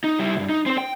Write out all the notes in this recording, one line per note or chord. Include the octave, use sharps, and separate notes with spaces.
D#4
G3 E4
C#2 G2
D#4
C4 C5
G5